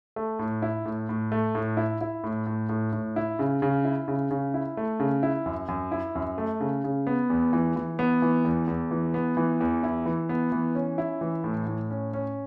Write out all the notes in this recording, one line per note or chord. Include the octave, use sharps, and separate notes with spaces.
A3
A2
E4
A2
A2
A3
A2
E4
E4
A2
A2
A2
A2
E4
C#3
C#3
E4
C#3
C#3
E4
A3
C#3
E4
F#2
F#2
E4
F#2
A3
C#3
C#3
B3
E2
E3
E3
B3
E3
E2
E2
E3
B3
E3
E2
E4
E3
B3
E3
C#4
E4
E3
A2
A2
C#4
C#4